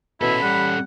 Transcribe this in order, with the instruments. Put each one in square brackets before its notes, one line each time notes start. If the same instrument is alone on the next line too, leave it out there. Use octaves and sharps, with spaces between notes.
[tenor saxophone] B2 [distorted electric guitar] C#4 A4 [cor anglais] E4 [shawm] B5
[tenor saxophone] G3 [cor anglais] F#5